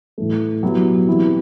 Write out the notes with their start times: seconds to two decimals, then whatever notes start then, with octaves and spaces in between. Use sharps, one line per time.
0.18 A2 E3 A3
0.63 B2 F#3 B3 E4 G4
1.07 E3 G3 C4 E4 G4